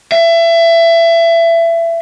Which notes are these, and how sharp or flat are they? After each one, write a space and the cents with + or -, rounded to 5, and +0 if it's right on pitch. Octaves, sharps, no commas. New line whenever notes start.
E5 +25